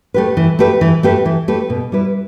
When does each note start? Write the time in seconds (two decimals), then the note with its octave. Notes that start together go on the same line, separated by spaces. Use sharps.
0.14 A3 G4 B4
0.37 E3
0.59 A3 G4 B4
0.81 E3
1.03 A3 G4 B4
1.25 E3
1.48 A3 G4 B4
1.70 B2
1.92 G3 E4 B4